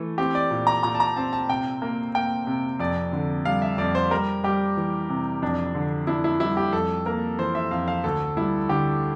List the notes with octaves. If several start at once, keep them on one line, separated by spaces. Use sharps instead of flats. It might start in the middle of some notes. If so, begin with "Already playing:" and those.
Already playing: E3 A3
C4 G4
D5
A#2
A#5
A#2 A#5
A5
A#5
C4 A5
A5
C3 G5
A#3
A#3 G5
C3
F2 D5
D3
G3 F5
E5
F2 D5
C5
G3 A#4
G3 G4
E3
C3
F2 D4
D3
D4 E4
E4
G3 E4
G4
F2 A4
A#3 A#4
E3 C5
E5
F2 F5
F5
D2 A4
G3 E4
D3 G4